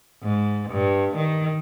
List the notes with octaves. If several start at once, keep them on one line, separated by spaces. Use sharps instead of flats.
G#2
G2
D#3